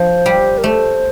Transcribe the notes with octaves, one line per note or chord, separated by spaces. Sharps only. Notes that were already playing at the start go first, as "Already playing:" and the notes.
Already playing: F3 C5
G3
A#4
A3 C5